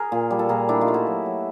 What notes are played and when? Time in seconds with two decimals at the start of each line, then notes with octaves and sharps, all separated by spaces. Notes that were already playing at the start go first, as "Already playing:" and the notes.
Already playing: G#4 A#4
0.12 A#2
0.30 G3
0.39 A4
0.49 A#2 G#4 A#4
0.68 A3 D4 E4
0.81 D#4 F4
0.88 A3
0.94 E4 F#4
1.07 F#3
1.26 F#3